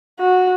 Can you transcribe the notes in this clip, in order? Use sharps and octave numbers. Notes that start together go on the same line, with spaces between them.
F#4